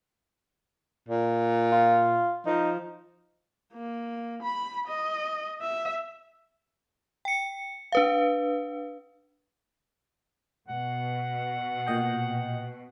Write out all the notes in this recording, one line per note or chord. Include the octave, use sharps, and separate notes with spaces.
A#2
F4
F3 D#4
A#3
B5
D#5
E5
G5 C#7
D4 B4 F5
B2 F#5
A#2 D#5 G5